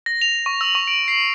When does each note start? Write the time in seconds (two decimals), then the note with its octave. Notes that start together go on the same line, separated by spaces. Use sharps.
0.06 A#6
0.21 F7
0.46 C#6
0.61 E6
0.75 C#6
0.87 D7
1.08 C7